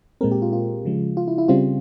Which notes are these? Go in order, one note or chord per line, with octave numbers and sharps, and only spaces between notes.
A#2 G#3 C4 A#4
G4
F4
F4
C#3 F3 G#3
F4
E4
E4
C#3 G3 C4 F4